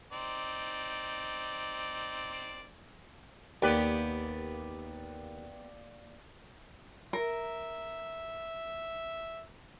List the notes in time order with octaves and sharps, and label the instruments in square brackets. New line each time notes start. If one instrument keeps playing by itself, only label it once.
[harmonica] C4 D#4 D5
[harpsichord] D#2 [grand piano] A#3 D5 [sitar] B3 G4 B4
[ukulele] A#4 [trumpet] E5